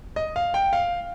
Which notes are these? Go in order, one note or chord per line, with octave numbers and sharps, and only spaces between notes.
D#5
F5
G5
F5